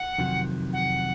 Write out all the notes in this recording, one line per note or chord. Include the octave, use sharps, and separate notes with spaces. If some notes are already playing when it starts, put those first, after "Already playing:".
Already playing: F#5
F2 C3 D#3 F#3
F#5